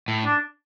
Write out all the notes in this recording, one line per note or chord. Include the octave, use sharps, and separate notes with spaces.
A2
D4